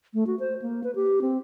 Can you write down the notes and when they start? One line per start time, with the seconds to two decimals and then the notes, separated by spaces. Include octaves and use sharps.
0.14 A3
0.27 F#4
0.40 C5
0.62 A#3
0.84 B4
0.95 G4
1.22 C4